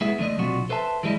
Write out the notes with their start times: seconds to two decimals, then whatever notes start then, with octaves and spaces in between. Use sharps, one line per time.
0.01 G#3 B3 E4 G#4 E5
0.18 D3 F3 A3 D4 D#5
0.38 B1 C3 F3 D4 F4 F#4
0.69 A4 B4 C5 E5 A5
1.03 E3 G3 G#3 E4 D#5